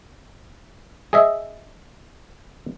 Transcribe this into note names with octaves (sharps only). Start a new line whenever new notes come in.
G#4 D#5 E5